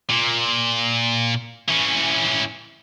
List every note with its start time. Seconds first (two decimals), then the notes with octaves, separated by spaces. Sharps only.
0.10 A#2
1.68 E3 C#4